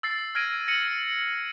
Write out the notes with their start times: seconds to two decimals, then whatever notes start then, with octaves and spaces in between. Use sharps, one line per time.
0.03 E6 A6 C7
0.35 F6 G#6 A#6 D7 D#7
0.68 A#6 C#7 D#7 F#7